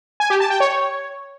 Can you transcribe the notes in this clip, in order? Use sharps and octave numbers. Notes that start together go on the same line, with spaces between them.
G#5
G4
A5
G5
C#5